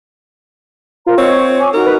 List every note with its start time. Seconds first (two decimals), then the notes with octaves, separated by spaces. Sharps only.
1.06 F4 A#4 C5 A#5
1.18 C4 F4 C#5 D#5 E6
1.39 C#6
1.60 G#5 C#6 D6
1.74 D#4 F#4 A#4 A#5
1.86 B4